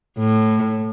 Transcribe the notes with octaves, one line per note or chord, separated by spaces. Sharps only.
A2